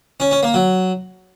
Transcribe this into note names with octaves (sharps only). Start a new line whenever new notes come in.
C#4
C#4
A#3
F#3